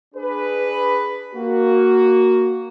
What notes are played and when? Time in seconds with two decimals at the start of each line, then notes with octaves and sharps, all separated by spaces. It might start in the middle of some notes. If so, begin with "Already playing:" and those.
0.15 D4 G#4 B4
1.34 A#3 F#4